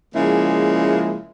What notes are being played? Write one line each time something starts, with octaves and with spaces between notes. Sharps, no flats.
C#3 F3 G#3 A#3 E4